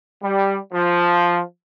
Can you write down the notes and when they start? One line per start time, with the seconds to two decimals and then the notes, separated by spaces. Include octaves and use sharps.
0.23 G3
0.72 F3